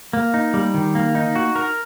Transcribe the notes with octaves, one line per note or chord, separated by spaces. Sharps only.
A#3
D#4
G3
D#3
A#3
D#4
F#4
A#4